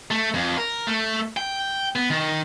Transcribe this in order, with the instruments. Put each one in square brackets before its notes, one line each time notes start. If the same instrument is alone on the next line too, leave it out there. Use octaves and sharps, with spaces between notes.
[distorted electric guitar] A3
F2
A#4
A3
G5
B3
D#3